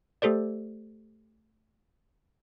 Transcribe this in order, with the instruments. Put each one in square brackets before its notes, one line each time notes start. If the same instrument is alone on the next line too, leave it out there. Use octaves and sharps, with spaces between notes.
[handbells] A3 G4 A4 C5 D5